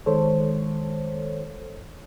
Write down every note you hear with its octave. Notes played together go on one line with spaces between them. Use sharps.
D#3 G#3 A4 C5 C#5